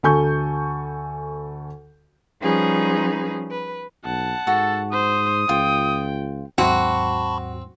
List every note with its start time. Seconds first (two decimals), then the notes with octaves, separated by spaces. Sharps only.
0.03 D2 A4 G#5 C#6 G6
2.42 F3 G3 C#4 D#4 G#4 B4
3.51 B4
4.05 B1 F#5 A5
4.47 G#2 F#4 A4
4.92 C5 D#6
5.49 C#2 F4 G5
6.58 D#2 G#2 F#3 C4 F#4 A5 B5 C#6